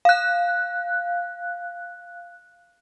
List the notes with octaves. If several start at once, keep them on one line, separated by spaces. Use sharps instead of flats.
F5 F#6